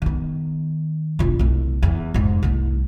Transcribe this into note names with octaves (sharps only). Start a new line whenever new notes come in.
D#3 B3
E1 F4
C2 A3
E2
F1 G#2
C2 A3